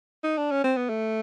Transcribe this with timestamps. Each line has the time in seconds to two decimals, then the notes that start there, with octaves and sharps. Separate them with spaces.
0.24 D#4
0.38 D4
0.51 C#4
0.64 C4
0.76 B3
0.89 A3